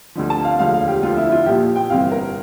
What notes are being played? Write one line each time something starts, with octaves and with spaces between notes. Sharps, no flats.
D2 D3 F3
A5
F5
E1 D2 D3 F3 F5
F5
G4
D2 D3 F3 F4
E4
E4
F4
A#1 A#2 F3 G4
G5
G1 F2 C3 E3 F5
A#4